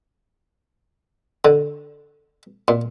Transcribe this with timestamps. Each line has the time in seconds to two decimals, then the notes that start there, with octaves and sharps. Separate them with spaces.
1.45 D3
2.68 A#2